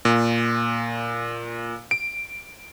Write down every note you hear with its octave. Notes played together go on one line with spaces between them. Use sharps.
A#2
D7